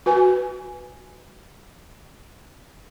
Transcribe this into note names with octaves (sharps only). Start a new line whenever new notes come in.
F#4 B4 G#5